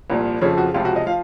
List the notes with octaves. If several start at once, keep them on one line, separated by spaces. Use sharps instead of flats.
C2 A#2 F3
F2 C#3 F3 C#5
F#4
C#2 C3 F3 F4
F#4
D#5
F3 F5